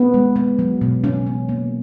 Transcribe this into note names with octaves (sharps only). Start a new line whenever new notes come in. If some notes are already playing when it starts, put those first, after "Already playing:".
Already playing: B3
G#3
B3
F#3
B2
E3 C#4
B3
A#3